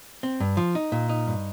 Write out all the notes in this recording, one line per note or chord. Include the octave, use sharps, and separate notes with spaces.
C4
G2
F3
D#4
A#2
D#4
G2